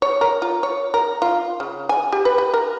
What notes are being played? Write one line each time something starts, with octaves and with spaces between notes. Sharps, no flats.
C#5
A#4
F4
C#5
A#4
F4
C#3
G#5
G4
B4
B4
A#4